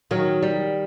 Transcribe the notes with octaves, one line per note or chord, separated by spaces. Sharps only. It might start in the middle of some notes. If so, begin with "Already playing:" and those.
D#3 F#3
G3